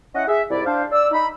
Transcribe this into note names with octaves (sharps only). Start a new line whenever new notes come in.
C#4 E4 D#5 F#5
G#4 E5
C2 G#2 E4 D5
D4 C5 F5
D5 E6
D#4 B5